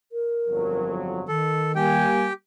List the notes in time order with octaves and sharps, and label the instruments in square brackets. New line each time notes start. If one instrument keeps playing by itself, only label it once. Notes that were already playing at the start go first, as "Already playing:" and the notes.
[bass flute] A#4
[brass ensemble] G1 F2 F#3
[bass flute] D#3 [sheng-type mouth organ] A4
[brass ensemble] G3 A#3 G#5 [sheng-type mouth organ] G4 G5